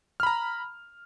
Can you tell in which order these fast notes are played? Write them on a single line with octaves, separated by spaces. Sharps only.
F6 B5 A#5